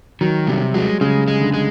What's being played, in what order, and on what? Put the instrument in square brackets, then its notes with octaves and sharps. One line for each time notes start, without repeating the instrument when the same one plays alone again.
[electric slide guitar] D#3 [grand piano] F#3
[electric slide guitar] C3 [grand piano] G3
[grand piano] F#3 [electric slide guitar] G#3
[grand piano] C#3 [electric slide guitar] G#3
[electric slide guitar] G#3
[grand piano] D3
[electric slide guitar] G#3